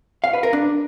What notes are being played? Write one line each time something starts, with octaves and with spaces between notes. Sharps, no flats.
F5
B4
A#4
D4